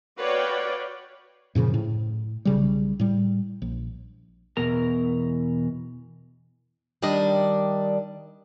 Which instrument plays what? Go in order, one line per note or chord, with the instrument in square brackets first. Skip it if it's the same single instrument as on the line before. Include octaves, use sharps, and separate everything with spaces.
[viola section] F#4 B4 C#5 D5 F5 G5
[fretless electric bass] F#2 A#2 C#3 F3
A2
B1 C#3 G3
A2 G3
A#1
[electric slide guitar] E2 B2 E3 A#4 A#5
[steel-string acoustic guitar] D#3 G3 D4 D5 D#5